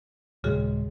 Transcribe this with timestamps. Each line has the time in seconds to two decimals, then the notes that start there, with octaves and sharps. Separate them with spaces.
0.44 D#1 C#3 G#3 F#4 G#4